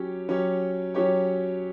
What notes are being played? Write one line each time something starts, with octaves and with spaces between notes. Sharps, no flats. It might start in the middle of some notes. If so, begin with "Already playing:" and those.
Already playing: F#3 C#4 G4 C#5
F#3 C#4 G4 C#5
F#3 C#4 G4 C#5